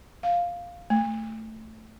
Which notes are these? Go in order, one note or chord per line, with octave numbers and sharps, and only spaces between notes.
F5
A3